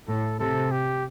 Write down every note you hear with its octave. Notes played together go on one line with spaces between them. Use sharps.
A2 A4
C3 A4
G4